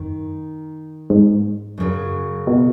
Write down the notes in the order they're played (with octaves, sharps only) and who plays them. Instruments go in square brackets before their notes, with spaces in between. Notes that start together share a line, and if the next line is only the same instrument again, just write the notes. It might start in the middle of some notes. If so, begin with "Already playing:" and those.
Already playing: [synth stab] F#2 [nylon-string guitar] D#3
[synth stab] G#2
[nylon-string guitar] F#2 C#3 F#3
[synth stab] B2